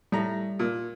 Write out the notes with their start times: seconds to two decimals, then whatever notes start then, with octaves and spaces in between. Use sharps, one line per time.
0.12 A2 G3 A#5
0.59 A#2